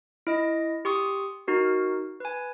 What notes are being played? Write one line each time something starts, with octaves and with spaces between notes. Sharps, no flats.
E4 D#5
G4 C6 C#6 D#6
D#4 F#4 A#4
B4 G#5